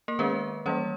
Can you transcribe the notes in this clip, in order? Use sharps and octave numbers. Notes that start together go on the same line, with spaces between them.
A#3 A#4
D#3 G#3 B3 C#4 B4
E3 G3 A#3 C#4 C#5